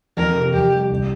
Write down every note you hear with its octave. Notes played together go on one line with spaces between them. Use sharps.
F2 A#4
C3
F2 G4
G3
C2